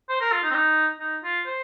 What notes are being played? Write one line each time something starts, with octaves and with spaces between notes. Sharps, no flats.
C5
A#4
F4
D#4
C4
D#4
D#4
F4
C5